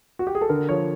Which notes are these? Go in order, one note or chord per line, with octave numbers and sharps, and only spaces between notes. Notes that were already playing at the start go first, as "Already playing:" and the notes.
F#4
G4
G#4
A4
D3 A#4
F3 C#5